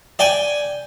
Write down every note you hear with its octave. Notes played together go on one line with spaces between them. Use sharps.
D5 G5 G#5